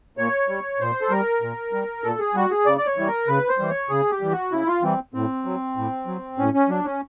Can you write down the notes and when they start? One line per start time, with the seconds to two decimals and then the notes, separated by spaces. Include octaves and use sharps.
0.17 A#2 C#5
0.49 G3
0.80 A#2 C5
1.01 A4
1.10 G3 A#4
1.42 A#2
1.73 G3
2.04 A#2 A4
2.19 G#4
2.34 G3 F#4
2.51 G#4
2.66 C#3 D5
2.78 D5
2.86 C#5
2.96 E3 G3
3.07 A#4
3.28 C#3 B4
3.48 C5
3.58 E3 G3
3.70 C#5
3.89 C#3 G#4
4.11 G4
4.20 E3 G3
4.31 F#4
4.51 C#3 E4
4.67 F4
4.82 E3 G3 C4
5.14 A2 C4
5.45 F#3
5.77 A2
6.07 F#3
6.38 A2 C#4
6.54 C#4
6.69 F#3 D4
6.85 C#4